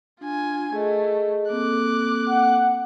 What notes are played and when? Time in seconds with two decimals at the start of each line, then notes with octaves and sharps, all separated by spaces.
0.21 D4 F4 G#5
0.73 A3 G#4 D#5
1.50 A#3 C4 A4 D6 F#6
2.29 F#5